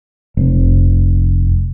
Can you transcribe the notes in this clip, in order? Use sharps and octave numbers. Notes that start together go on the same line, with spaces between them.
F1